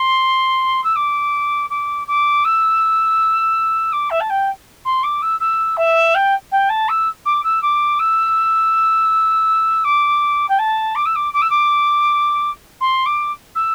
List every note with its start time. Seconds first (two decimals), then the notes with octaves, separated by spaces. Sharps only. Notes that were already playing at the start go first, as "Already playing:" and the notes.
Already playing: C6
0.84 E6
0.96 D6
1.70 D6
2.07 D6
2.45 E6
3.92 D6
4.10 E5
4.20 A5
4.30 G5
4.85 C6
5.03 D6
5.22 E6
5.40 E6
5.77 E5
6.15 G5
6.52 G5
6.69 A5
6.89 E6
7.26 D6
7.44 E6
7.62 D6
7.99 E6
9.84 D6
10.49 G5
10.59 A5
10.95 D6
11.06 E6
11.16 D6
11.33 D6
11.42 E6
11.50 D6
12.81 C6
13.06 D6
13.55 E6